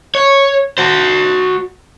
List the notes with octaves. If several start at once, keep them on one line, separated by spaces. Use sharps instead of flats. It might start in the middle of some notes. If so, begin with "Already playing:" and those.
C#5
F#4 C5